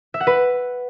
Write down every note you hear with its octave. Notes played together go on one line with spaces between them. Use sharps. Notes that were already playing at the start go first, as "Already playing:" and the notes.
E5
F#5
B4